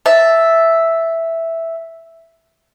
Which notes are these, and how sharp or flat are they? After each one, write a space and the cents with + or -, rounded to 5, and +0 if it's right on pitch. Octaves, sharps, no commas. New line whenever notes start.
E5 +0 A5 +0